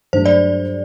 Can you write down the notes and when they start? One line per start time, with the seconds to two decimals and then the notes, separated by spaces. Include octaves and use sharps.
0.13 G2 F#3 A3 D4 C5
0.26 D5